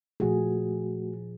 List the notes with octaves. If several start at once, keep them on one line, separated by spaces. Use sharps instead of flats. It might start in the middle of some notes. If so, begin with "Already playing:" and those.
A#2 F3 A3 F#4 G#4